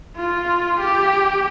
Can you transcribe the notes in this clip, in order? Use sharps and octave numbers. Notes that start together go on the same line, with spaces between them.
F4
G4